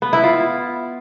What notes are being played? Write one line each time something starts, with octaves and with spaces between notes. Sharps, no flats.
B3
E4
F4